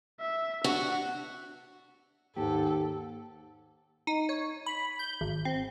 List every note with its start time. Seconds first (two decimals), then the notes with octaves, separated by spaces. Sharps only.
0.20 E5
0.64 D4 F#4 F#5
2.36 D#2 G#2 G4 A4
4.07 D#4
4.29 C#5
4.66 B5
4.99 G6
5.21 G#1
5.45 C4